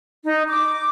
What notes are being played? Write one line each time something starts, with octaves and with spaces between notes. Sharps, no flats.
D#4
D6